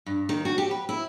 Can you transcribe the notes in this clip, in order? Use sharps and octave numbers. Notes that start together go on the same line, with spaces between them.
G2
D#3
F#4
G4
B4
E4